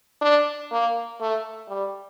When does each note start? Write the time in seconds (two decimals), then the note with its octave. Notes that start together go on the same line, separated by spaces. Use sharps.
0.22 D4
0.71 A#3
1.20 A3
1.68 G3